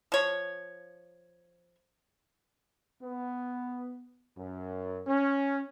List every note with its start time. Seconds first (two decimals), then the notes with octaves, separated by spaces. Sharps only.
0.12 F3 C#5
3.01 B3
4.37 F#2
5.07 C#4